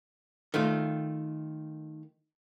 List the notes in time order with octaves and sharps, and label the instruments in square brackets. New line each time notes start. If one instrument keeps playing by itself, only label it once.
[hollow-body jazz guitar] D#3 A3 F4